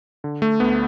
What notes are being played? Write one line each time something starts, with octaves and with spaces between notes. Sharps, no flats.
D3
A3
D2 B3